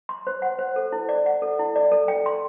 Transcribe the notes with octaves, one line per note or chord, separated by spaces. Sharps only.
C6
C5
F#5
C5
A4
E4
D5
F#5
A4
E4
D5
A4
G5
C6